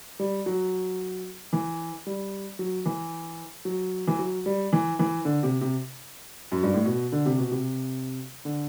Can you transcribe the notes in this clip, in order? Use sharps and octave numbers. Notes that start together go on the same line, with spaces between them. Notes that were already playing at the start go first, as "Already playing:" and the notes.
G3
F#3
E3
G3
F#3
E3
F#3
E3
F#3
G3
E3
E3
D3
C3
C3
F#2
G2
A2
B2
D3
C3
B2
C3
D3